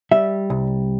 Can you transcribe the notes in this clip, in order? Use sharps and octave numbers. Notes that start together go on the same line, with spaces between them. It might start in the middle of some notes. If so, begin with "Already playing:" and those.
G3 E5
C2